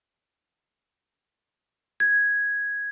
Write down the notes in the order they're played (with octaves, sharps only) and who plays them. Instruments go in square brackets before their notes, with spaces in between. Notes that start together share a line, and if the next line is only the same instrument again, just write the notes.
[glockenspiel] G#6